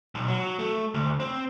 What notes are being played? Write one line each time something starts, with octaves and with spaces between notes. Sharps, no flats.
B1
F#3
A3
D2
C4